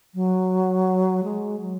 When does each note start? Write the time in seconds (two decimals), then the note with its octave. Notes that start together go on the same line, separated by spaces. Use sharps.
0.15 F#3
1.24 G#3
1.60 F#3